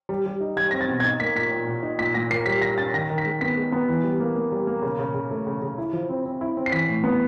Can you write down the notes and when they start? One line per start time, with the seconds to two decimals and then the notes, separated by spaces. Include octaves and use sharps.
0.09 G3
0.26 G3
0.41 D#4
0.56 G3 G#6
0.71 C4 A#6
0.81 A6
0.89 B2
1.00 G#6
1.04 D#4 A6
1.20 A#3 B6
1.35 A#2 B6
1.51 A#2
1.67 A#2
1.83 D#4
1.99 A#2 B6
2.14 A#2 A#6
2.30 A#3 C7
2.46 G3 B6
2.61 G3 A#6
2.78 C#4 A6
2.94 D#3 A#6
3.10 D#3
3.18 B6
3.26 G#3
3.41 B3 B6
3.57 G#3
3.72 B3
3.89 E3
4.04 G3
4.20 A#3
4.36 A#3
4.52 G3
4.67 A#3
4.82 C#3
4.99 C#3
5.14 C#3
5.31 A3
5.47 C#3
5.62 C#3
5.78 E4
5.93 F3
6.09 C4
6.26 C4
6.41 E4
6.57 C4
6.66 C7
6.72 E3 B6
6.89 A2
7.04 B3